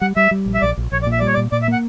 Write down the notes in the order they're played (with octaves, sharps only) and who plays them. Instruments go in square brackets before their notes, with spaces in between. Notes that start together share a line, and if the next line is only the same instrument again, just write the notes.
[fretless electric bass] G3 [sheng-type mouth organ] F#5
[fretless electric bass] G3 [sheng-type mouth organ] E5
[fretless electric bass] G3
A#1
[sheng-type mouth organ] E5
[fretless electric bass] A#1 [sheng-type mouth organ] D5
[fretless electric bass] A#1
[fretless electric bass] A#1 [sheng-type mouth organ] C#5
[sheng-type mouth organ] D5
[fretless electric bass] A#2
[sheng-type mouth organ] E5
[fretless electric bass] G3 [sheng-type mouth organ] D5
[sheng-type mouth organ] C#5
D5
[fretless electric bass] A#2
[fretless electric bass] A#2 [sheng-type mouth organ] D5
[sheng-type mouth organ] E5
[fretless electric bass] A#3 [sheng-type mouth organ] F#5